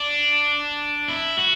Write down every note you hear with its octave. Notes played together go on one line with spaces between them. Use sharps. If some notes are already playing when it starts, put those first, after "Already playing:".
Already playing: D4
E4
F#4